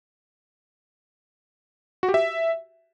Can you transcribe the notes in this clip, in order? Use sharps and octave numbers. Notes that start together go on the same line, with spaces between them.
F#4
G4
E5